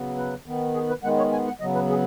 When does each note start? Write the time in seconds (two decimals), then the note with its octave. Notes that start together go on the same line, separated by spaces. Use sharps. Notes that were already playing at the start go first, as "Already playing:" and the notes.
Already playing: C#3 F#3 B3
0.17 B4
0.46 D#3 B3
0.74 G#4
0.89 B4
1.03 D#3 G#3 B3 F#5
1.18 C#5
1.32 G#5
1.47 F#5
1.60 C#3 F#3 B3 D#5
1.75 B4
1.90 G#4